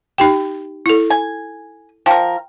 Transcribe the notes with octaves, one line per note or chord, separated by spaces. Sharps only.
D#4 G4 G5
E4 A4
G#5
F3 A#4 G5